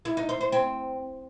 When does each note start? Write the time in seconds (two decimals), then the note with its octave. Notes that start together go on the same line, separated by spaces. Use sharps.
0.05 E4
0.17 D#4
0.29 C5
0.41 C5
0.52 C4